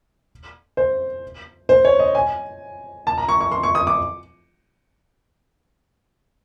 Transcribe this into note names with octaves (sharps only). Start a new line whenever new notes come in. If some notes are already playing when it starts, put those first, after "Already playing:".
C5
C5
C#5
D#5
G#5
A5
A#5
C#6
C#6
C6
C#6
D#6
D6